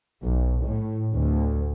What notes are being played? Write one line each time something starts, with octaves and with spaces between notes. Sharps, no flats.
B1
A2
D2